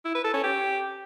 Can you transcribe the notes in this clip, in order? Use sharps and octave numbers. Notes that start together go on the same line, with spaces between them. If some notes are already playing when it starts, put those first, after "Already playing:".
E4
B4
A4
C#4
G4